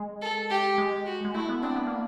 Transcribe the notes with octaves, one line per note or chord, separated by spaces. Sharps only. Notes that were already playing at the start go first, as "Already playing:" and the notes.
Already playing: G#3
A4
G4
G#3
F#4
G#3
A3 E4
B3
C4 D4
B3
A#3